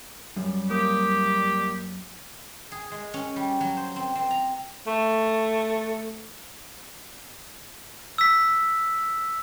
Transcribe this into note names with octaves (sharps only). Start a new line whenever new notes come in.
F#2 G3
A#3 G4 A#4 D#6
G#4
G#3
C#4
G3
F#3
C5
C4
C4
A#5
A3
E6 B6